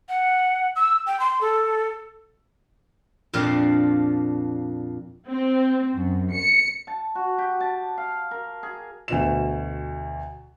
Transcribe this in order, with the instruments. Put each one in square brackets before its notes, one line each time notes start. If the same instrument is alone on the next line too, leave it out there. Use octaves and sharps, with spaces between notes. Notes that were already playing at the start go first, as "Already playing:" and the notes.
[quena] F#5
E6
G5
C6
A4
[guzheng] F2 A#2 D4 F4
[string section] C4
F#2
C#7
[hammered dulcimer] A5
F#4
G4
A5
F5
A#4
G#4
[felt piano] D2 B2 E7